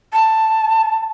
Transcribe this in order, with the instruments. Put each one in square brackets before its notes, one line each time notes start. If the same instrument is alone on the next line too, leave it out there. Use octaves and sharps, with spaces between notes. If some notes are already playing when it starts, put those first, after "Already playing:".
[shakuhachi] A5